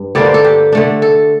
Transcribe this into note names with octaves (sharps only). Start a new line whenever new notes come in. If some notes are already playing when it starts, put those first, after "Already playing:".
Already playing: G2
D3 G3 A#3 D4 D5
C5
A4
G4
D3 A3 D4
A4